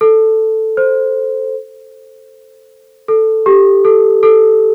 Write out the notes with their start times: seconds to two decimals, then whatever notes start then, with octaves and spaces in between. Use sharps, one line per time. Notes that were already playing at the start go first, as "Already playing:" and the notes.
0.01 A4
0.77 C5
3.08 A4
3.46 G4
3.85 A4
4.23 A4